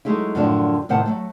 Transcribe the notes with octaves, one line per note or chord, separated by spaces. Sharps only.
F#3 G#3 A3 D#4 E4
F#2 A2 D3 F3 D4 F#4
A2 C3 D#3 C5 F#5 A5
F#3 G#3 A3